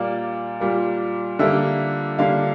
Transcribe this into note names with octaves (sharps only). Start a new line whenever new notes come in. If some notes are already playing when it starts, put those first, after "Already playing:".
Already playing: A#2 G3 A#3 D5
A#2 G3 A#3
D3 G3 A#3 E5
D3 G3 A#3 F5